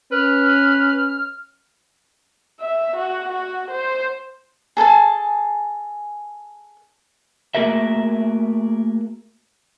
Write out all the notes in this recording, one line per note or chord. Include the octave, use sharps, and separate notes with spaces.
C#4 B4 F6
E5
F#4
F#4
C5
G#4 A4 G#5 A5
A3 A#3 F#4 G#4 A#4 E5